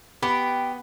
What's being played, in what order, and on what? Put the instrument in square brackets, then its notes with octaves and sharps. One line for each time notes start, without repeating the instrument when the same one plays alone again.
[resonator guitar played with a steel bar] B3 [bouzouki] G4 [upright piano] B5